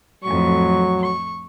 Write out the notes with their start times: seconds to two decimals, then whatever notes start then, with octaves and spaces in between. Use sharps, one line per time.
0.24 F2 A2 F#3 C#6
1.03 C#6